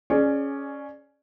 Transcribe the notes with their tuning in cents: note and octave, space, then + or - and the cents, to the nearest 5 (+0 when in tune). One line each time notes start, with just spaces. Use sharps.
C#4 +0 G#4 +15 D5 +20